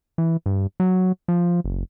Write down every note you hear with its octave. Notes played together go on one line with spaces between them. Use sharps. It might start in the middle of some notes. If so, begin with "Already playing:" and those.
E3
G2
F#3
F3
F#1